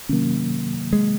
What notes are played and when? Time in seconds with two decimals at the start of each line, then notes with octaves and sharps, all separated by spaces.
0.09 C3 D#3 F#3 A#3 C#4
0.93 G#3